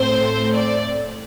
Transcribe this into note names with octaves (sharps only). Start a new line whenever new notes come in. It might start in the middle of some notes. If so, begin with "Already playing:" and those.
Already playing: A2 A3 C4 C5
D5